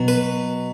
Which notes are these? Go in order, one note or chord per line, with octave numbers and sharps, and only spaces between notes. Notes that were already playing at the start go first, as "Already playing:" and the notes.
Already playing: B2 F#3
B4